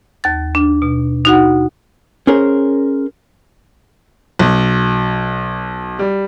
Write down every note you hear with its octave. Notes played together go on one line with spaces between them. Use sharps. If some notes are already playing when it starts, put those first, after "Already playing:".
D#2 A6
D4
B2
D#4 F#4 F#5
C#4 G#4 A#4 C5
B1
G3